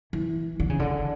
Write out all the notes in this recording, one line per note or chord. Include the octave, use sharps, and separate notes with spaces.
E3
D3
C#3
D3